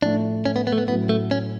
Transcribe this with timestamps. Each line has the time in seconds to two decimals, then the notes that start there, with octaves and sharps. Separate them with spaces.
0.02 A2 F3 A3 D4
0.46 C#4
0.56 B3
0.67 B3
0.72 A3
0.78 B3
0.88 A2 F#3 B3 C#4
1.09 A3
1.31 C#4